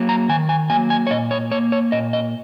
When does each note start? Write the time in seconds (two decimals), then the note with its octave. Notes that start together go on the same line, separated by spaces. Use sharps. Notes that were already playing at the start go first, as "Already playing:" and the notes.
Already playing: F#3 A#3
0.09 A#5
0.29 D#3 G#5
0.49 G#5
0.70 F#3 A#3 G#5
0.90 G#5
1.07 C#5
1.10 A#2 D#5
1.31 C#5
1.51 A#3 C#5
1.72 C#5
1.92 A#2 D#5
2.13 D#5